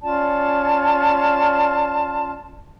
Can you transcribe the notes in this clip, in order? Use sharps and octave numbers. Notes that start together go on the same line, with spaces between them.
C#4 F4 D5 A5